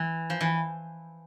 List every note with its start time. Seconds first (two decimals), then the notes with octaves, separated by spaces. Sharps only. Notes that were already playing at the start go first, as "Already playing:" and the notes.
Already playing: E3
0.30 F3
0.41 E3